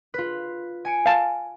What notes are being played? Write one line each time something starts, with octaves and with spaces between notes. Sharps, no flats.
F4 B4
G#5 C#7 D7
F5 A5